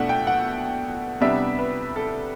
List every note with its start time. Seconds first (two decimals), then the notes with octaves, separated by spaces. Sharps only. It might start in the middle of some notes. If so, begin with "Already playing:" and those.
Already playing: B2 A3 D4 E5 F#5
0.09 G5
0.27 F#5
1.21 C3 G3 B3 D4 E5
1.59 B4
1.96 A4